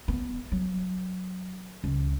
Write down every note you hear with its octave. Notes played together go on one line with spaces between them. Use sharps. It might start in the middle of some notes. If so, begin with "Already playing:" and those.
B3
F#3
C#2